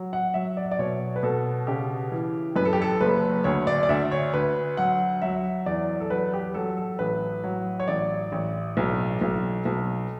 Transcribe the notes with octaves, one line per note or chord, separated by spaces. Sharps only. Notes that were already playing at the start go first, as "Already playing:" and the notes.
Already playing: F#3
F#5
F#3 E5
D5
E5
D5
B2 C#5
B4
B2 A4
C#3 G4
E3
F#2 B4
A4
G4
A4
F#1 B4
D2 C#5
D5
D5
D2 E5
C#5
D2 B4
F#3 F#5
F#3 E5
E2 D5
A4
F#3 B4
G4
F#3 A4
A4
A1 B4
F#3
C#5
A1 D5
A1
B1
B1
B1